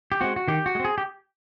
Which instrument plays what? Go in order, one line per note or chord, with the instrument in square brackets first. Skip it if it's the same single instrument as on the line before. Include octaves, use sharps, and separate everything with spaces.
[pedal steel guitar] G4
G#3 C4 F#4
F#4
D#3 G4
F#4
G#3
C4
G#4
G4